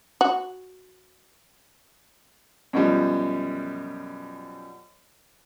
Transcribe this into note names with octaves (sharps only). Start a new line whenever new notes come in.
F#4
F#2 B2 F3 G3